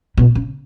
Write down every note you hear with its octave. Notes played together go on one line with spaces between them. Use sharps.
B2
C#3